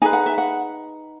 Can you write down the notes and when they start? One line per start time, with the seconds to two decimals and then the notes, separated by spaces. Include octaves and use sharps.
0.02 D#4 G#4 B4 G#5
0.13 F#5
0.26 E5
0.38 F#5